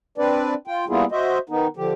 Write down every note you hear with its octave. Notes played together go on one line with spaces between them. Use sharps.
C4 D4 B4 D5
F4 G5
G3 A#3 B3 E4 F4 G#4
F#4 C5 D#5 E5
D#3 B3 D#4
D3 F3 G4